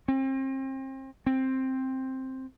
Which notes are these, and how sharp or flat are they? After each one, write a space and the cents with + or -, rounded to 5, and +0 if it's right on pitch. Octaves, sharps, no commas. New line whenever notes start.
C4 +35
C4 +5